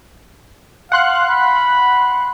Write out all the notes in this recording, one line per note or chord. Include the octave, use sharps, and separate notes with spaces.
F5 F#5 C6 F#6
B5